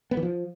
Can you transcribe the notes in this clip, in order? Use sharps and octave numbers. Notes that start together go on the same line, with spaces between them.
B3
E3
F3